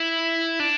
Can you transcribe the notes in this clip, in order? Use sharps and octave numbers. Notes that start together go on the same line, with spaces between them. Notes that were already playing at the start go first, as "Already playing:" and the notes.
Already playing: E4
D4